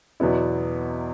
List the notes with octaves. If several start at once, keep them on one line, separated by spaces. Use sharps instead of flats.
E2 B2 F#3 B3 E4